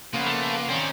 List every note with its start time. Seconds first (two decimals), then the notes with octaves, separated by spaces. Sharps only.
0.14 C#3 F3 A#3 B3 F4 B4
0.26 A3
0.69 D#3 C4 C#4 D5